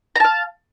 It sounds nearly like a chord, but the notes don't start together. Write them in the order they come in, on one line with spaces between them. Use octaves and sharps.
A#5 A5 F5